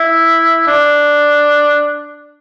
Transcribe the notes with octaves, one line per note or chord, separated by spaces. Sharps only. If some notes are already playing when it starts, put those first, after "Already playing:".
Already playing: E4
D4